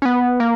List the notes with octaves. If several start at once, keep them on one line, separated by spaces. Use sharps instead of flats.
C#4
B3
A#3